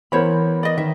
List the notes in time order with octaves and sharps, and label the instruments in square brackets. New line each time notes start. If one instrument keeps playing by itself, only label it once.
[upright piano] E3 B3 A#4 [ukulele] C5 C#5 B5
[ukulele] D5 D#5
[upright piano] D#3 [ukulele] E5